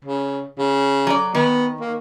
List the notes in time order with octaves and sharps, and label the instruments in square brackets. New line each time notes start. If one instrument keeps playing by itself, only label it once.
[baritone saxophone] C#3
C#3
[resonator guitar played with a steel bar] F#3 D5
[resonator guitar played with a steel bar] D#3 [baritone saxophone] B3
[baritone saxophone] A#3